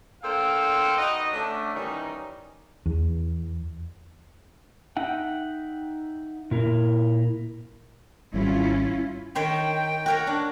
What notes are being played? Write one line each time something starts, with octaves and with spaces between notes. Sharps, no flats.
A#3 D4 A4 C5 F5 G5
D#4 F#4 B4 D#5
D3 A3 C#4 D4
D#3 E3 G3 C#4 D#4
E2
D#4 E5 F#5 G5
A#2 E4 A#4
G#1 G3 C#4 E4 F4
D#3 C5 C#5 G5
F#4 A#4 C#5
D4